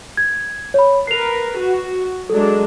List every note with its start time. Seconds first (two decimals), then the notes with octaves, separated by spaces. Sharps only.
0.17 G#6
0.74 C#5 B5
1.07 A#4 B4 C7 F7
1.59 F#4
2.30 F#3 G#3 D4 A4